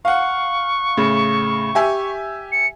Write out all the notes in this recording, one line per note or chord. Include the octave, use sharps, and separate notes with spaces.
F5 F#5 C#6
A2 C#3
G4 E5 G#5
C#7